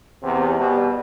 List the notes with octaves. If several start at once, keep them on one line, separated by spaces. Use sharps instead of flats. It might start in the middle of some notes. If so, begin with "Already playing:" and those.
E2 C3
B2 G3